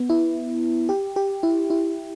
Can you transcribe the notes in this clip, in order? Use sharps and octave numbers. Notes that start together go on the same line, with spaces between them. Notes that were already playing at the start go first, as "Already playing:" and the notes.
Already playing: B3
E4
G4
G4
E4
E4